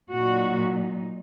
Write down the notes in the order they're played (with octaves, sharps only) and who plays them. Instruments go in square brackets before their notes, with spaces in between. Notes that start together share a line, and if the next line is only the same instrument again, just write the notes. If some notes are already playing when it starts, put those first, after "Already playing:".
[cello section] A#2 F#3 D#4 F#4